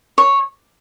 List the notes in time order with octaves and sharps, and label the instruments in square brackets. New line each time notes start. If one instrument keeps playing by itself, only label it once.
[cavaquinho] C#5